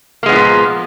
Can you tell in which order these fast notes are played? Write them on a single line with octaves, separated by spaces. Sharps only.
A#3 G#3 B3 F3 A#2